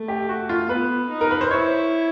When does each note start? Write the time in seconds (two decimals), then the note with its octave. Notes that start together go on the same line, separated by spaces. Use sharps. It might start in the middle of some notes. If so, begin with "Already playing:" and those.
Already playing: A3
0.08 G4
0.29 F#4
0.49 F4
0.69 B3 B4
1.10 D#4
1.21 A#4
1.31 B4
1.41 C5
1.51 E4 C#5